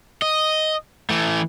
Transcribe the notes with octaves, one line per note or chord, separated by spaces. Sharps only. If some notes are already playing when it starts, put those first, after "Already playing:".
D#5
E3 A3